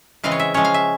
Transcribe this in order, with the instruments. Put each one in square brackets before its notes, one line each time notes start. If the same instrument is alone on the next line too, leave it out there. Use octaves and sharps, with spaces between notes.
[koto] C#3 E3 G#3 C4 F5
C#5
E5
F3 G#3 C#4 C#5
F5
E5